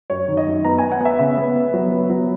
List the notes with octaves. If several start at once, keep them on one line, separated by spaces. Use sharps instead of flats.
F#2 C#5
D#3
D#5
F#2
B3 A#5
B3 G#5
F#5
B3 E5
C#3 E5
B3
B3
F#3
B3
F#3